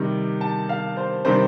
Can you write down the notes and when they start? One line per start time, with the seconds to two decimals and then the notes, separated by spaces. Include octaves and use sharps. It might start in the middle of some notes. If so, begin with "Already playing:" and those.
Already playing: C3 D#3 G3
0.41 A5
0.69 F5
0.97 C5
1.25 C3 D#3 G3 C5